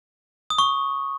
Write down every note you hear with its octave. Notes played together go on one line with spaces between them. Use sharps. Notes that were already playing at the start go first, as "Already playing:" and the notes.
D#6
C#6